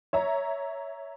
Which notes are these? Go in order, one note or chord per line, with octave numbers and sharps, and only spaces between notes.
C#5 E5 A#5